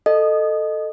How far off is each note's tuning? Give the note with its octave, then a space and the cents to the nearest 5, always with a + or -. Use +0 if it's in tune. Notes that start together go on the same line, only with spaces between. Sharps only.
A4 +5 D#5 -15